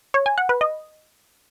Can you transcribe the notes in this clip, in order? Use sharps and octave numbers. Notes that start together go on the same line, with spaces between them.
C#5
G#5
F#5
B4
D#5